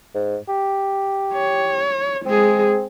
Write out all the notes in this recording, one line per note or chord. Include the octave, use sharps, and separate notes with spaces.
G#2
G4
C#5
G#3 C4 G#4